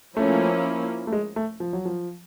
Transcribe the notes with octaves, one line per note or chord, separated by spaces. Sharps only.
F3 A3 A#3 C#4 E4
A3
G#3
A3
F3
F#3
F3